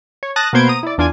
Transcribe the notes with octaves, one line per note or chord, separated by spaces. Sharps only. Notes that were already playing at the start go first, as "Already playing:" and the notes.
C#5
A5 D#6 F#6 A6 A#6
B2 A#3 B3 C5 G#6 D7
A#5 D#6
E4 D5
E2 D4 F4 D5 G#5